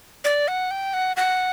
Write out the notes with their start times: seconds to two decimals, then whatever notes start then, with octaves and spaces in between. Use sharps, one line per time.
0.24 D5
0.48 F#5
0.71 G5
0.94 F#5
1.17 F#5